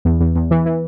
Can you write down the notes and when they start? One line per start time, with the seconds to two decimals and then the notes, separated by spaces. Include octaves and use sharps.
0.05 E2
0.20 E2
0.36 E2
0.51 E3
0.66 E3